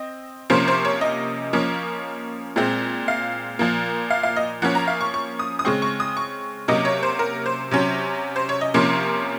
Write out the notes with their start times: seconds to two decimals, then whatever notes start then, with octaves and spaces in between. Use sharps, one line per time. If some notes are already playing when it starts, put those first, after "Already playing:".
Already playing: C4 D#5
0.50 C3 F3 A#3 C#4 C5
0.68 C5
0.85 C#5
1.01 D#5
1.53 F3 A#3 C#4
2.56 A#2 G#3 C4
3.08 F5
3.59 A#2 F3 A#3
4.10 F5
4.23 F5
4.36 D#5
4.62 F3 A#3 C#4 F#5
4.75 A#5
4.88 F5
5.01 C#6
5.14 C#6
5.39 D#6
5.59 D#6
5.65 C#3 G#3 C4 C#6
5.82 C#6
6.00 D#6
6.17 C#6
6.68 C3 F#3 A#3 C#4 D#5
6.85 C#5
7.03 C5
7.19 A#4
7.46 C5
7.71 C3 F#3 C#4
8.36 C5
8.49 C#5
8.61 D#5
8.74 C3 F3 A#3 C#4 C6